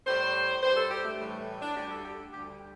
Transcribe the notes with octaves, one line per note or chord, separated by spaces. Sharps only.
A2 G3 C5
G2 G3 C5
A4
G4
A3
A2 E3 G3
D4
D2 D3 G3 G4
A4
G4
D2 D3 G3 G4